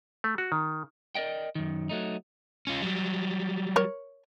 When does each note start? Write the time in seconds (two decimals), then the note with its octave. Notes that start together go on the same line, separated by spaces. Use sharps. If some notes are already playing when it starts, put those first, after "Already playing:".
0.24 A3
0.38 F#4
0.52 D#3
1.15 A#4 D5 D#5 G5
1.55 F#2 D#3
1.89 F#3 A3 D#4
2.67 C#4 F4
2.82 F#3 G3
3.76 A#4 C#5